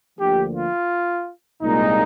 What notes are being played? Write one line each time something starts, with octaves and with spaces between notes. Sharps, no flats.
D2 D3 F3 A#3 G4
F4
C2 A#2 G#3 D#4